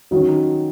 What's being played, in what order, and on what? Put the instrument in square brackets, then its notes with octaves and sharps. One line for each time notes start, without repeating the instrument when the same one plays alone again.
[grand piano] D#3 [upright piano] F#3 C#4 F#4